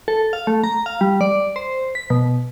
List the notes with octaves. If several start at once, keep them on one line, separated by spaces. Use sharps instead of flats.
A4
F5
A3
A#5
F5
G3
D5
C5
B6
B2